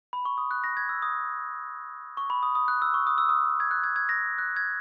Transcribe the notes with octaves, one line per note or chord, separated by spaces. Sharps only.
B5
C#6
D#6
F#6
A#6
G#6
E6
D#6
C#6
B5
D#6
D#6
F#6
E6
C#6
D#6
E6
D#6
G#6
F#6
G#6
G#6
A#6
F#6
G#6